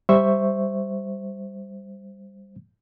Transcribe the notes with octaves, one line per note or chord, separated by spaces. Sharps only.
G3 C5 E5 C#6